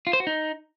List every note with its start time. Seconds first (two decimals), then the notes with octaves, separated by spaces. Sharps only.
0.07 F4
0.13 C5
0.20 F#4
0.27 D#4